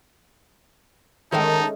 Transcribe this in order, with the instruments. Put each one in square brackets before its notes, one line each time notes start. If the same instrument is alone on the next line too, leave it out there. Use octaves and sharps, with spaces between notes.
[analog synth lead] D#3 [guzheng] G#3 A3 C#4 [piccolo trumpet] D#4 [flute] A5